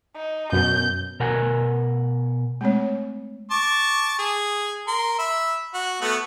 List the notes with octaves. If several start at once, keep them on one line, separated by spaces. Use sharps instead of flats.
D#4
F#2 B2 G6
B2 A#4 F#5 G#5
G#3 A3 C4 C#5
A5 C#6 D6
G#4
A#4 C6
E5 B5
F#4
A3 B3 F#4